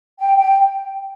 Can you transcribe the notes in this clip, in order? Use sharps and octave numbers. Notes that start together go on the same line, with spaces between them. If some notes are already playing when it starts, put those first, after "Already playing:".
G5
G5